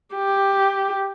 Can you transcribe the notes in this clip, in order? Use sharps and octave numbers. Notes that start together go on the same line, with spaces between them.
G4